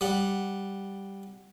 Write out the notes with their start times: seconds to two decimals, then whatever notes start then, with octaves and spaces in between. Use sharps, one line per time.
0.01 G3 F#5